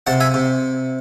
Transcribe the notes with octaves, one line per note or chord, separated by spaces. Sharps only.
C3 F#5 A5
E5 G#5
C3